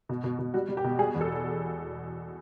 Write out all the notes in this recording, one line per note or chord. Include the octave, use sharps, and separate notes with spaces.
B2
B2
B2
G3 F#4
G3
G4
B2
G3 G#4
E2
A4